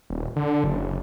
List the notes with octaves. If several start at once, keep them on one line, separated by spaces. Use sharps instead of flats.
D#1
D3
F#1